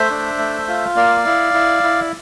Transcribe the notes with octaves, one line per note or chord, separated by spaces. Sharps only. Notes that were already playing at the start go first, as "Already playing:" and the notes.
Already playing: A3 C5 E5
D4
A3
F4
A#3 D5 F5
E4
E4
E4